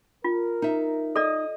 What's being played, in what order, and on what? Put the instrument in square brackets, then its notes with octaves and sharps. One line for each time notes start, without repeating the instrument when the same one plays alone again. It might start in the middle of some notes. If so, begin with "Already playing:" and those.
[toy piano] F4 [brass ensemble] A#4
[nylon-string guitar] D#4 E5
[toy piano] A4 D5 [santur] D#5